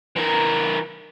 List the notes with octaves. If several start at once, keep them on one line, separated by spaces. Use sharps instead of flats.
E3 A#4